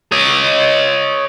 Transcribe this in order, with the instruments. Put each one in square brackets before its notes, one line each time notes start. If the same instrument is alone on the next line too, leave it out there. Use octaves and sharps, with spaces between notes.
[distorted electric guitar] C#5 D#5